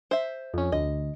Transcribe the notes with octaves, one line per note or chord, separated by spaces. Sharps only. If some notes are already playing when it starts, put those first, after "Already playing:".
C5 E5
F2 C#4
D2 D#5